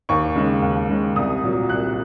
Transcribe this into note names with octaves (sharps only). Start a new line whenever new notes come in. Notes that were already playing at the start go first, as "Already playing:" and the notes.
D#2 C#6
C#3 G#3
D#2
C#3 G#3
C2 D#6
A#2 F#3
C2 F#6